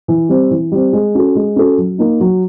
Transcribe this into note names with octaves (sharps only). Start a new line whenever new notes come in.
E3
G3 C4
E3
G3 C4
G#3
C#4 F#4 A4
G#3
C#4 F#4 A4
F#3
A#3 D#4
F#3